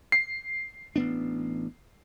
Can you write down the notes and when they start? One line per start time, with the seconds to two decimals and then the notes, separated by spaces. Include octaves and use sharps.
0.12 C7
0.96 A1 B3 D4